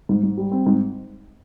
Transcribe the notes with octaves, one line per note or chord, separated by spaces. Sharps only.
G#2
G#2
G3
C4
G#2